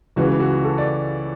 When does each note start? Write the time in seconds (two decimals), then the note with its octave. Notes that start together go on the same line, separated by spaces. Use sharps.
0.16 C#2 C#3 E3 F#4
0.40 F#4
0.64 A4
0.78 D5